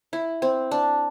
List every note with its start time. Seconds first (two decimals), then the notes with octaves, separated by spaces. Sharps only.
0.13 E4
0.42 C4
0.71 D4